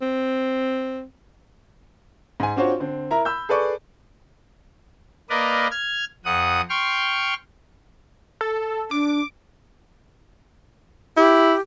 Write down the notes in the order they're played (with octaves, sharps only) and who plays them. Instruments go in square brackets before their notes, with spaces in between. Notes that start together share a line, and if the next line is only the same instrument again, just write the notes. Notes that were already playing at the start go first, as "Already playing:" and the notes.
[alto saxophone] C4
[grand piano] G#2 G#5
C4 D4 F4 F#4 C5 C#5
D3 C4
E4 A#4 A#5
B5 E6 G6
G#4 A4 B4 D5 C#6
[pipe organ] A#3 A#4 B4 D5 D#5
F6 G#6
F2 F#5 D#6
G5 C6 C#6 F6
[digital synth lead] A4
[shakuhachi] D4 [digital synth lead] D6
[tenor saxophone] E4 [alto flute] G4